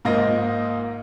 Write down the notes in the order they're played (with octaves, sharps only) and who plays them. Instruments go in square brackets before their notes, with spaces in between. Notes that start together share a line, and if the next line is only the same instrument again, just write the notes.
[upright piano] G#2 A#3 F4 D#5 A#6